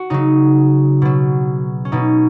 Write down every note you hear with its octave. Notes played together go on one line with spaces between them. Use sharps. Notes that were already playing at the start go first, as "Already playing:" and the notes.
Already playing: F#4
C#3 F#3 D#4
B2 F#3
C#4
B2 F#3 D#4